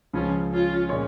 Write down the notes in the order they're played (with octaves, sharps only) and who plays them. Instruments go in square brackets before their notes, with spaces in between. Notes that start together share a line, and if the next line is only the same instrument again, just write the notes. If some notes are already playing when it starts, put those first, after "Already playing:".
[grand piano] C#2 C#3 F3 [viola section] C#4 F4
[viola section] C#4 F4
[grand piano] A#2 G#3 C#4 G#4 C#5